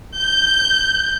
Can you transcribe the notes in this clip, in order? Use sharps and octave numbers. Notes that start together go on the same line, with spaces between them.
G6